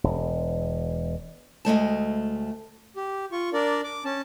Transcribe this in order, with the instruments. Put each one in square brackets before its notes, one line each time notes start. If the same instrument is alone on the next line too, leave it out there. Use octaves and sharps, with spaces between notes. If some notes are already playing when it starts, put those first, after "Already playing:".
[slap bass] E1
[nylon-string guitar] D2 G#3 A3 A5
[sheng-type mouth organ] G4
F4 C#6
D4 A#4 D5
D6
C#4 A5